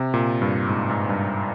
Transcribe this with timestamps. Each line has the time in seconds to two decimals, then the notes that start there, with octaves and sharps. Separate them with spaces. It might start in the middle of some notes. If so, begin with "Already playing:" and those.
Already playing: C3
0.14 A#2
0.42 G2
0.68 G#2
0.89 G#2
1.09 G2